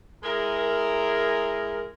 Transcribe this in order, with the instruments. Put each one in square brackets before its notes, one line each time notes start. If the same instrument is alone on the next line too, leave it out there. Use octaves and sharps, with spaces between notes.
[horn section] G#3 E4 G#4 A#4